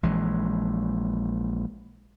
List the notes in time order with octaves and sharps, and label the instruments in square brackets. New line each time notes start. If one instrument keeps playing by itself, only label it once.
[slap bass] A#1 E3 G#3